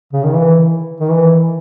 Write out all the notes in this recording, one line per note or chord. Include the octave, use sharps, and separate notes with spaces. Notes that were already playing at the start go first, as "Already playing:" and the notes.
C#3
D#3
E3
D#3
E3